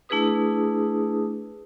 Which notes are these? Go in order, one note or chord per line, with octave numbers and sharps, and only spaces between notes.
A3 D4 E4 G#4 B4 D#6